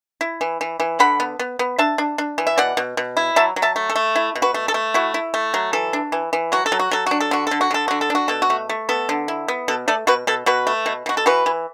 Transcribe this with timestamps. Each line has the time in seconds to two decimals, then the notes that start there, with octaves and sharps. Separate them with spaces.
0.21 E4
0.41 E3
0.61 E3
0.80 E3
1.00 D3 F#5 B5
1.20 B3
1.39 B3
1.59 B3
1.78 D4 E5 A5
1.98 D4
2.18 D4
2.38 E3
2.47 E5
2.58 B2 D5 F#5
2.77 B2
2.97 B2
3.17 E4
3.36 F#3 E5 A5
3.56 F#3
3.62 E5 A5
3.76 A3
3.89 A4
3.96 A3
4.16 E4
4.35 B2
4.42 F#4 B4
4.54 A3
4.68 A4
4.74 A3
4.94 E4 F#4
5.14 E4
5.34 A3
5.54 F#3
5.73 E3 A4
5.93 D4
6.12 E3
6.33 E3
6.52 F#3 F#4
6.66 A4
6.72 F#3
6.79 F#4
6.91 F#3 A4
7.06 D4 F#4
7.20 A4
7.31 D3 F#4
7.47 D3 A4
7.61 F#4
7.71 D3 A4
7.88 D3 F#4
8.01 A4
8.10 D4 F#4
8.28 B2 A4
8.42 F#4
8.50 A3
8.69 A3
8.89 B3 A4
9.09 D3
9.28 E4
9.48 B3
9.68 B2 A4
9.88 A3 A4 D5
10.07 B2 F#4 B4
10.27 B2 A4
10.46 B2 F#4 B4
10.67 A3
10.86 B2
11.06 B2 F#4
11.17 A4
11.26 E3 F#4 B4
11.46 E3